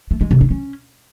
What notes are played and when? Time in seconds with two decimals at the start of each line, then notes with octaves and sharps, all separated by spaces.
0.11 A3
0.21 G#3
0.31 C3
0.41 D4
0.51 C#4